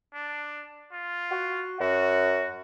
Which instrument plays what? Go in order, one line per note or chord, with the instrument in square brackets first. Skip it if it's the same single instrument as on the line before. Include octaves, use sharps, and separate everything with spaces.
[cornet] D4
F4
[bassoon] F#4
[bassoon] F#2 [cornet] F#4